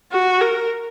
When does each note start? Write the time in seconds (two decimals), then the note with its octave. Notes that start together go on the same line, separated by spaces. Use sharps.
0.12 F#4
0.41 A#4